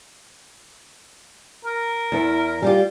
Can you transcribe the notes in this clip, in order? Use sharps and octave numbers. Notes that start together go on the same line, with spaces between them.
A#4
E2 E4
G3 F4 G4